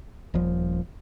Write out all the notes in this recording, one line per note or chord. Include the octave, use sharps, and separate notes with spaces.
D#1 F3